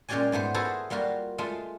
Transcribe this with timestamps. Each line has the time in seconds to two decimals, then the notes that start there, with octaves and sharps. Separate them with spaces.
0.09 A#2 G#3 C#4 G4 D5 G#5
0.32 G#2 A3 B3 C5
0.54 E4 F#4 G#4 A4 B4 C5
0.90 G3 A#3 F4 F#4
1.38 G#3 A3 F4